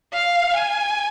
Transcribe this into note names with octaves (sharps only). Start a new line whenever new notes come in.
F5
G#5